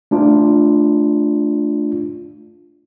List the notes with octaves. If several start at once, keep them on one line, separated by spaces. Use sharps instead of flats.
A3 D4 F4